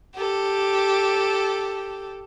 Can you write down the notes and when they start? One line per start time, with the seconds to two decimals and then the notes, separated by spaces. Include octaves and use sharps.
0.16 G4 A4